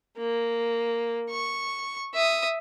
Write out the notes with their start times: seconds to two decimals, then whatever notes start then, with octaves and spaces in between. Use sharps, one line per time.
0.18 A#3
1.30 C#6
2.14 E5 D#6